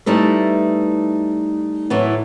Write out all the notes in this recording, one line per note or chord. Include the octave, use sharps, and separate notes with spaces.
G3 A3 D#4 E4 B4
A2 E3 F#3 A3